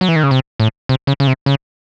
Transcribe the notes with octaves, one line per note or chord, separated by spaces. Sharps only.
F#3
E3
D#3
C#3
C3
A2
C3
C#3
C#3
C3
C#3